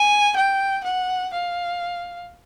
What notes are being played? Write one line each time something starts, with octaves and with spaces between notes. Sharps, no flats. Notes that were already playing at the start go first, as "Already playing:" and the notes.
Already playing: G#5
G5
F#5
F5